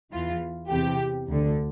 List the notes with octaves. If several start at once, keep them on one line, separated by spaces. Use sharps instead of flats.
E2 E3 F4
E2 C3 E3 G4
D2 D3